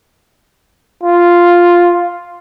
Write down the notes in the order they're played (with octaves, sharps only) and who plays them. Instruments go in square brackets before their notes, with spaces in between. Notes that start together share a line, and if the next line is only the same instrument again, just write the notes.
[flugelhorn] F4